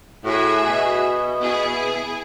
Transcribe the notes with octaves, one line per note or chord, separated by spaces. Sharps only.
A2 F#4 G#4 E5
B2
B3 E4 G#4